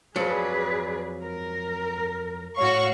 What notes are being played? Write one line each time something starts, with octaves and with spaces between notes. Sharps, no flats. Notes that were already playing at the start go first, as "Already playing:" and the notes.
F2 F#3 G#4 B4 D5
A#4
A2 F#4 C#5 F5 C#6